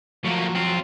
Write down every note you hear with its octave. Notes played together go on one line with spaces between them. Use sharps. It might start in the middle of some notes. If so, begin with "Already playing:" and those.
A2 F3 F#3 A#3
C4 F4